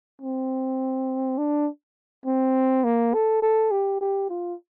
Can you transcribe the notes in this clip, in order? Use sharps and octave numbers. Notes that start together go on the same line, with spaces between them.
C4
D4
C4
A#3
A4
A4
G4
G4
F4